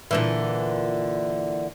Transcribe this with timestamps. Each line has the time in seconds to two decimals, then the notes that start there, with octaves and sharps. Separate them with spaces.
0.11 A#2 D3 E3